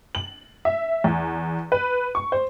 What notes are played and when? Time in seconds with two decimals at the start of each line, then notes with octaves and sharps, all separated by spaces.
0.15 F#7
0.65 E5
1.04 E2
1.72 B4
2.15 C#6
2.32 C5